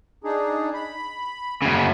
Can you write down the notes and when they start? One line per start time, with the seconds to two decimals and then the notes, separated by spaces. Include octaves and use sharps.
0.24 D4 D#4 G#4
0.74 B5
1.62 F#2 C#3